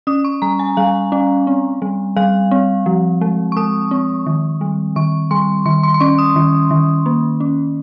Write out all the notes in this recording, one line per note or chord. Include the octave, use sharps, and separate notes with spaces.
C#4 D#6
C#6
G3 A#5
G#5
G3 F5
C#4
C4
G3
G3 F5
C4
F3
G#3
C#6
G#3 D#6
C4
D#3
G3
D#3 C#6
G3 C6
D#3 C6
C6
C6
C#4 C#6
D#6
D#3
D#3
A#3
C#4